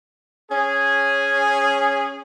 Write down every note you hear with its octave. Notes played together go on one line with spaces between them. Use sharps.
C#4 G#4